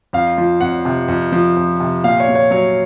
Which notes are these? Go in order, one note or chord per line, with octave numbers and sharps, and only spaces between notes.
F2 F5
F3
F2 F#5
C3
F2
F3
F2
C3
A#2 F5
C#5
A#2
C#5
F#3 C#5